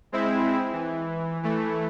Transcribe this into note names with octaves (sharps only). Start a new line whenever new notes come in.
G#3 C4 E4
E3
E3 A3